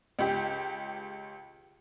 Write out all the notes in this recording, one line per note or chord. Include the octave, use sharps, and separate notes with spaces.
C#2 G4